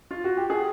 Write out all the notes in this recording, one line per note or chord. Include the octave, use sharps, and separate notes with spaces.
F4
F#4
G4
G#4